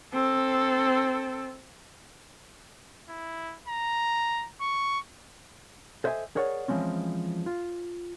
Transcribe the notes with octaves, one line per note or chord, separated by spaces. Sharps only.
C4 A4
E4
A#5
C#6
A4 C5 D#5 E5 G5 G#5
G#4 A#4 C#5 D5 F#5
E3 F3 G#3 C4 C#4
F4